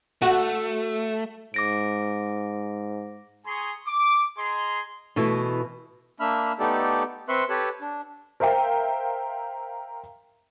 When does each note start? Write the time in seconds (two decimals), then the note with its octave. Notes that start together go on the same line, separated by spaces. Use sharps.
0.22 A3 F#4
1.54 G#2 D6 A#6 D7
3.46 G#4 G#5 A#5 C6 C#6 D#6
3.87 D6
4.38 G#4 D#5 A#5 C6
5.16 B2 E3 A3 E4
6.20 A#3 D4 E5 B5 F6
6.59 A3 B3 D#4 G4 A4 D5
7.29 C4 B4 E5 C6 C#6 F#6
7.49 G4 A4 B4 C#5 A5 F#6
7.81 D4
8.40 A#4 C5 E5 F5 G5